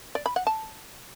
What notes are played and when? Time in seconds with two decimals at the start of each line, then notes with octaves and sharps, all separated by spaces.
0.15 D5
0.26 B5
0.36 F#5
0.47 A5